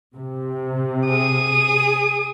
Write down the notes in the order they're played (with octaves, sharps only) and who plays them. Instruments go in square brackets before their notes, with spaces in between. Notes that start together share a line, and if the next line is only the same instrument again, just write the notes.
[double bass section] C3
[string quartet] G#4 D#6